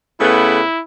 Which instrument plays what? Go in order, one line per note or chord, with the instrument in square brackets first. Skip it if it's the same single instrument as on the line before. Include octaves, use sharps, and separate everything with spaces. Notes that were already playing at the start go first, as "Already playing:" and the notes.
[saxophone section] C#3 A3 B3 [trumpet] E4